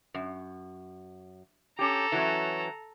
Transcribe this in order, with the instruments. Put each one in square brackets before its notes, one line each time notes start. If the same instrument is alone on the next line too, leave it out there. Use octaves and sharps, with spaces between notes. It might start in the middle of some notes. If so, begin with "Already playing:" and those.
[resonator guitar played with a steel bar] F#2
[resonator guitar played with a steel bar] C#4 G4 [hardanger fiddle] A4 A#5
[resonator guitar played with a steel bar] E3 F#3 C#4